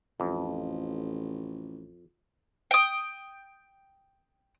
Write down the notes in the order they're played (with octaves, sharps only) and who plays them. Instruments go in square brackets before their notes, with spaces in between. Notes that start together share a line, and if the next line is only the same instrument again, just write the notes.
[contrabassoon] A1 [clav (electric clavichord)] F2
[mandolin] G5 D#6